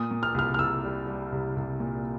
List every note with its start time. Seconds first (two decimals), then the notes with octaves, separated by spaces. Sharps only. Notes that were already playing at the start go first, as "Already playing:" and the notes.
Already playing: A#2 D#6
0.11 A#2
0.23 F6
0.34 C2 F6
0.54 F6
0.59 C2 E6
0.84 G3
1.07 G3
1.32 C2
1.56 C2
1.80 A#2